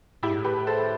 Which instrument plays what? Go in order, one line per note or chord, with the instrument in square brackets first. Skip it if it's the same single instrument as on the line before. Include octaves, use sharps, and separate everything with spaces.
[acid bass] A2 [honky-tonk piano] E4 G4
[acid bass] G2
A2
[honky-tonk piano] G4 B4
A4 C5